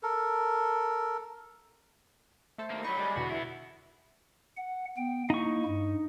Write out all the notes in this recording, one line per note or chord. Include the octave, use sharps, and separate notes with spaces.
A4 A#4
A3 A4 C5
A#3 D#4
F#3 D#4 B5 C#6
G3 G#3 D6
E2 B2 D3 B3 F#4
B3 E4 E5
F#5
B3 G5
A#3 D#4 E4 C#6
G2